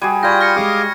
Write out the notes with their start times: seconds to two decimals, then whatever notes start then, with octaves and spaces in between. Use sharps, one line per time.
0.02 G3 F#4 G#4 G#6 D#7
0.23 F4 G4 D5 G5 B5 C#6 G#6 A#6
0.41 F6 A#6 C#7
0.56 G#3 G4 F5 D6 D#6